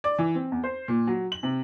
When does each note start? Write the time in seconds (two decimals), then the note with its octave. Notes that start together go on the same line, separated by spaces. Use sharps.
0.04 D5
0.18 E3
0.35 C4
0.52 E2
0.64 C5
0.88 A#2
1.07 F#3
1.32 F#7
1.43 C3